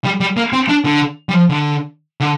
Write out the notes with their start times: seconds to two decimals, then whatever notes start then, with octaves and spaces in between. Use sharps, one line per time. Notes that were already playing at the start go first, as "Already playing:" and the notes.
0.05 G3
0.20 G3
0.37 A#3
0.53 C4
0.69 D4
0.85 D3
1.29 G3
1.34 F3
1.49 D3
2.20 D3